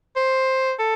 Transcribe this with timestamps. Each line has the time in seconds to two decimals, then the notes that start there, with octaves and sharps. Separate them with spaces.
0.16 C5
0.79 A4